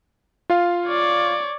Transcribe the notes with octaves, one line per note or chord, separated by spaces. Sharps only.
F4 F5
C#5 D5